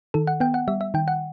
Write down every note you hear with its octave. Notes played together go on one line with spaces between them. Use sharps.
D#3 A4
F#5
B3 G5
F#5
G3 E5
E5
D#3 G5
F#5